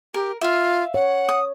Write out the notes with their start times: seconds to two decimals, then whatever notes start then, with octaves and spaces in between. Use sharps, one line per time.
0.14 G4 A#4
0.41 F4 E5 F5
0.94 C#5 F#5
1.29 D#6